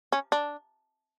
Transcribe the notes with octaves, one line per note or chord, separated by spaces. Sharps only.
C#4
D4